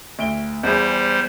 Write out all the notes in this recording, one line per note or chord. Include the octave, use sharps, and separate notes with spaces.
D2 D7 G7
E2 G3 G#4 C5